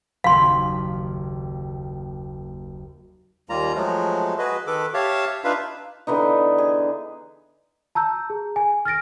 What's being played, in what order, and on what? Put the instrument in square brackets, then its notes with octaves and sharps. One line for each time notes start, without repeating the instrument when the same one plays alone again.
[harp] F#1 D#2 [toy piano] F5 C6
[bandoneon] D#2 G3 A#3 F4 A#5
F3 F#3 G#3 A3
F#4 G#4 B4 D#5
D#3 A4 B4 D6
G4 C#5 E5 F5 A5
D4 D#4 F4 B4 E5 F5
[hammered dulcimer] D3 E3 B3 D#4
G#4
[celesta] A5 A#5 E6 G6
G#4
G#5
F6 A6 A#6 D7